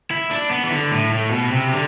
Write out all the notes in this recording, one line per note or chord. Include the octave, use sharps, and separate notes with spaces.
E4
D4
B3
E3
D3
A2
A2
B2
C3
D3